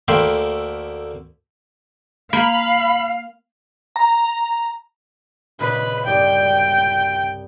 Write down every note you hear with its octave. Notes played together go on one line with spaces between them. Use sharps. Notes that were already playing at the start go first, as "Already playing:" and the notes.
D2 A3 A#3 G5 B5 C6
A#3 F5 B5
A#5
A#2 C#3 B4 D#5
C2 G2 D5 G5